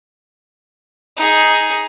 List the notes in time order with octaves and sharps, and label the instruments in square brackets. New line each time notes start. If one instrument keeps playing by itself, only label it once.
[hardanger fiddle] D#4 G#4